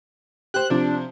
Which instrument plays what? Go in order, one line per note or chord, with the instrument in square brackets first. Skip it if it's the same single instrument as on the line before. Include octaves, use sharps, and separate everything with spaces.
[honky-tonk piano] G4 C5 [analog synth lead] F#6
[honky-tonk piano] C3 F3 [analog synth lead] D4